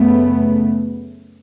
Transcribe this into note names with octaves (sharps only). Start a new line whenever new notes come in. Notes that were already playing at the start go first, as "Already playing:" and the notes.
Already playing: F#2 C#3 A3 B3